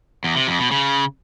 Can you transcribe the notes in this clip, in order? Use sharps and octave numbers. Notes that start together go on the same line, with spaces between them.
E2
C3
F2
B2
C#3